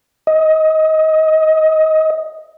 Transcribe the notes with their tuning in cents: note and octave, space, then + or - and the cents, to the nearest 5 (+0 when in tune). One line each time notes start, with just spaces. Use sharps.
D#5 +20